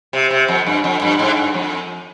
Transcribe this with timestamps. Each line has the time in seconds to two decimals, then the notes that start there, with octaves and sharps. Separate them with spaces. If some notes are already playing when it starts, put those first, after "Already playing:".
0.13 C3
0.31 C3
0.48 F2
0.66 G2
0.84 F2
1.02 G2
1.19 G#2
1.37 G2
1.54 F2